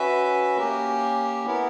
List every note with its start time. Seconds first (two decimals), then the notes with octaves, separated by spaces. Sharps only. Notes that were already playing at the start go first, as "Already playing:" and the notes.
Already playing: C#4 F#4 B4 E5
0.57 A#3 C#4 G4 A#4
1.46 B3 E4 A#4